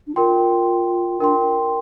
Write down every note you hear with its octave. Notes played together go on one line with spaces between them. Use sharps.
D4
F4 A#4 G5 C6
D4 A#4 G5 C6